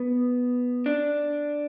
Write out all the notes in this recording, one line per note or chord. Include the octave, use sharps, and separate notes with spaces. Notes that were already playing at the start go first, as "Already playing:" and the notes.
Already playing: B3
D4